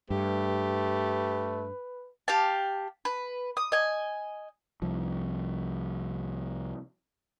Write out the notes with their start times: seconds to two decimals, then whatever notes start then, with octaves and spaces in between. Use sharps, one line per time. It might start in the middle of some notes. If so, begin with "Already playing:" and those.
0.10 G2 A3 G4 B4
2.28 G4 F5 A5
3.05 B4
3.57 D#6
3.72 D#5 G#5
4.82 C2 F3